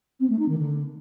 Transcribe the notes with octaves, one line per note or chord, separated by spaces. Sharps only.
C4
A3
D#4
D#3
D3